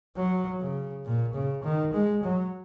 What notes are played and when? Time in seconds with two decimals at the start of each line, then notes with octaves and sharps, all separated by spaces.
0.16 F#3
0.61 C#3
1.05 A#2
1.34 C#3
1.64 D#3
1.94 G#3
2.23 F#3